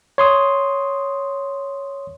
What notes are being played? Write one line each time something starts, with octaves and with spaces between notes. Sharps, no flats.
C#5 C6 D#6